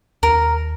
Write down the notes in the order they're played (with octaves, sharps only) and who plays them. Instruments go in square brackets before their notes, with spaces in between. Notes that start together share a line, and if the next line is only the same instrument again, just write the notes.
[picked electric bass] D#2 [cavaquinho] A#4